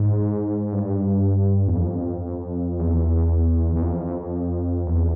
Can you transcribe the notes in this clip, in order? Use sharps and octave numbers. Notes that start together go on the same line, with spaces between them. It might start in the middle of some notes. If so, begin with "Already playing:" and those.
Already playing: G#2
G2
E2
F2
E2
E2
F2
E2